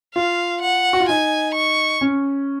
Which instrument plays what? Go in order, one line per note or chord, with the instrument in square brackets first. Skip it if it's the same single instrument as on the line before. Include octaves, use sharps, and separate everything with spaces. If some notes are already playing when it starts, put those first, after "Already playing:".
[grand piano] F4 [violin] F5
[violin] F#5
[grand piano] F#4
F4
[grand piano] D#4 [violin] G#5
[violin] C#6
[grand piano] C#4